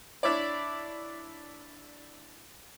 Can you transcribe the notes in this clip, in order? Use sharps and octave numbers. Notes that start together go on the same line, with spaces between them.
D4 E4 C#5 D5